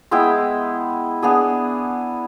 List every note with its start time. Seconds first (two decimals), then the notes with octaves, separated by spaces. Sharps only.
0.11 G#3 B3 E4 G5
1.22 B3 D4 G#4